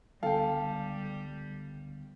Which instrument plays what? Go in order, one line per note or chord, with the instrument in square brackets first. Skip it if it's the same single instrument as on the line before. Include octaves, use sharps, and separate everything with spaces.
[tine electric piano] C#2 D3 B3 [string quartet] G3 [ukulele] A4 [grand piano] F5 G5